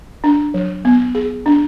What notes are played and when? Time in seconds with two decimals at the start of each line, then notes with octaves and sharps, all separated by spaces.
0.24 D4
0.54 F#3
0.85 B3
1.15 G#4
1.46 D4